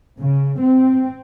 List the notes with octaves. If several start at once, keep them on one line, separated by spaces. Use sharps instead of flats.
C#3
C4